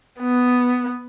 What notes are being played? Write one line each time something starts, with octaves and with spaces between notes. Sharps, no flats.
B3